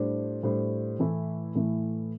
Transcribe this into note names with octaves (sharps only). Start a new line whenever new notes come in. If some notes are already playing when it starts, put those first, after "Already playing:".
Already playing: A2 G3 D4 C5
A2 G3 D4 C5
A2 E3 A3 E4
A2 E3 A3 E4